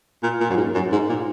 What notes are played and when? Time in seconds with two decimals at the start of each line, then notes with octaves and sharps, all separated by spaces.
0.23 A#2
0.40 A#2
0.50 F#2
0.57 G#2
0.74 F#2
0.92 G#2
1.09 A#2